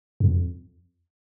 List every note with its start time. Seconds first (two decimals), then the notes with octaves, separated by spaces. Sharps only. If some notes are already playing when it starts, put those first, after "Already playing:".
0.20 F2